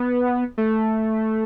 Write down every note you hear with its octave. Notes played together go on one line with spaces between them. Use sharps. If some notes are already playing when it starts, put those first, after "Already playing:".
Already playing: B3
A3